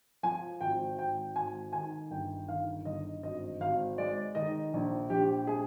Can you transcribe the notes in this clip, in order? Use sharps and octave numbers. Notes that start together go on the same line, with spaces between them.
F3 G#5
G#1 G5
G#1 G5
G#1 G#5
D#3 G#5
G1 G5
D#3 F5
G1 D#5
G#1 D#5
G#1 F5
G#3 D5
D#3 D#5
A#1
A#1 G4
G#3 G#4